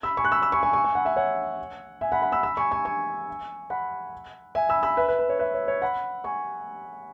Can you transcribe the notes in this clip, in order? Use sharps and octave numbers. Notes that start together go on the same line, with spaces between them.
B5 E6
G#5 C#6
F#6
B5 E6
B5 E6
G#5 C#6
G#5 C#6
G#5 C#6
G#5 C#6
F#5 B5
E5 G#5
C#5 F#5
E5 G#5
F#5 B5
F#5 B5
B5 E6
B5 E6
G#5 C#6
G#5 C#6
G#5 C#6
F#5 B5
E5 G#5
B5 E6
B5 E6
B4 E5
B4
B4
C#5
B4 E5
C#5
C#5
F#5 B5
G#5 C#6